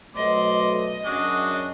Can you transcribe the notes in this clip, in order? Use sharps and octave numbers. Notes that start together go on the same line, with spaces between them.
B2 F#3 A3 C5 D5 D#5
F#2 D4 F#4 G#4